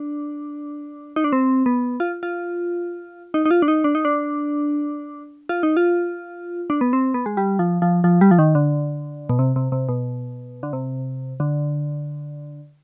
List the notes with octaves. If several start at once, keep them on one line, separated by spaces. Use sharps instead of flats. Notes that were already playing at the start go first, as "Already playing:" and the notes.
Already playing: D4
D#4
D4
C4
B3
F4
F4
D#4
D#4
F4
D4
D#4
D4
D#4
D4
F4
D#4
F4
D4
B3
C4
B3
G#3
G3
F3
F3
F3
G3
F3
D#3
D3
B2
C3
C3
C3
B2
D3
C3
D3